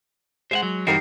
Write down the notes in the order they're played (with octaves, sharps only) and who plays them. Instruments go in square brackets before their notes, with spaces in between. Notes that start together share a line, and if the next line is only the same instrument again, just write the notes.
[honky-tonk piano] G#3 [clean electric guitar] C5 E5 F#5
[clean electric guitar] F#3
[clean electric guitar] G2 E3 F#4 [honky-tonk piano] D#4 G4 A#4 [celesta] C7